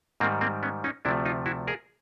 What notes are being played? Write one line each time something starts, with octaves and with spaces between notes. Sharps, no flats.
G#2 D#3 G3 A#3 C4
A#3 C4
B3 C#4
C#4 D#4
D2 C3 F3 A3 D4 E4
D#4 F4
E4 F#4
G#4 A#4